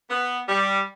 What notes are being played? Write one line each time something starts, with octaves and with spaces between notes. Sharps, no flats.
B3
G3